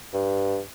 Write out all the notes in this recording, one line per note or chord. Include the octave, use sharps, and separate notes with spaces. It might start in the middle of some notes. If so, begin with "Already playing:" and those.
G2